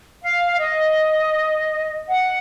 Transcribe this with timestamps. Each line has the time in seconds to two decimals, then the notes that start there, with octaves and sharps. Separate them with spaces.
0.22 F5
0.60 D#5
2.07 F#5